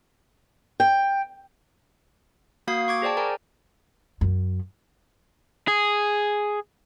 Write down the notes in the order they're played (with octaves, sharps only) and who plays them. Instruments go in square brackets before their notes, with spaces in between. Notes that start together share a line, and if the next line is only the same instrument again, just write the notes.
[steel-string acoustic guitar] G5
[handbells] A#3 F#4 F5 D#6 G#6 C7
C#6 D6 G#6
G#4 C5 D5 G5 A5
A#4 G#5 A#5
[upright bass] F#2
[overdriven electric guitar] G#4